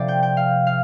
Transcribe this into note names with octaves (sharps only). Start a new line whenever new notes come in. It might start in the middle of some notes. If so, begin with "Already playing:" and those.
Already playing: C3 F3 A3 D4 C5 D5
G5
G5
F5
F5